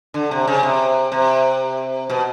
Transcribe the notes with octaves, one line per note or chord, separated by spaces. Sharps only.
D3
C3
C#3
C3
C3
B2